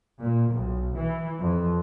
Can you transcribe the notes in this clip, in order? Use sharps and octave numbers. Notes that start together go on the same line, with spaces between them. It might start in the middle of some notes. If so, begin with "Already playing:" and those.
A#2
B1
E3
F2